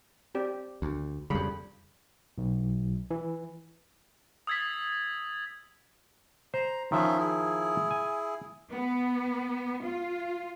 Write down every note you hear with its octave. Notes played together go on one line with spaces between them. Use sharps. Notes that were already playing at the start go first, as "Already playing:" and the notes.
C4 G4 D5
D2
F2 C#3 G3 B5
B1
E3
D#6 E6 G#6 A6 B6
C5 A#5
D#3 F3 C#4 F4 E5
E4 G#4
G#5
B3
F4